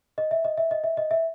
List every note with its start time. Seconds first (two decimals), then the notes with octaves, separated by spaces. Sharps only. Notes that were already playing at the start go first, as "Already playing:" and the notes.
0.18 D#5
0.31 E5
0.45 D#5
0.58 E5
0.71 D#5
0.84 E5
0.97 D#5
1.11 E5